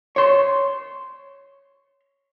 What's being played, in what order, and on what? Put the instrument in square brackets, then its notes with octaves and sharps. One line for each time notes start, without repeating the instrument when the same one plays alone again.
[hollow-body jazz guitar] C#5 C6